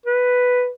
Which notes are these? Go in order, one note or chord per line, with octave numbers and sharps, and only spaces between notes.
B4